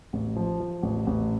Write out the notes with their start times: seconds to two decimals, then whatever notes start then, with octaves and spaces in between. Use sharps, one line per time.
0.13 A1
0.36 F3
0.60 F3
0.83 A1
1.07 A1